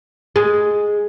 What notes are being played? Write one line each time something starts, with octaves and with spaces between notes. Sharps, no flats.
G#3